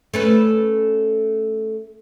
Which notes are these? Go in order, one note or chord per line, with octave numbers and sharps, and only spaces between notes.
A3 C#4 B4